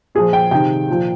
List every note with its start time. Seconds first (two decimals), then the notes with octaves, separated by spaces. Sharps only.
0.15 A#2 F3 G#4
0.33 G5
0.51 C3 D#3 G5
0.88 A#2 F3